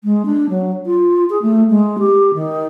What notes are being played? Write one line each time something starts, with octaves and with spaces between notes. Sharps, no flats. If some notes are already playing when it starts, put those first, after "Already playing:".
G#3
D4
F#3
F4
G#4
A3
G#3
G4
D#3